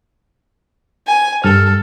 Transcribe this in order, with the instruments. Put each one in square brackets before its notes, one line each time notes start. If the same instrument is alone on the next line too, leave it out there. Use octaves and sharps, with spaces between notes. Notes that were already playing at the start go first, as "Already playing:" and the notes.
[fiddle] G#5
[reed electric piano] G2 F6 [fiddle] A4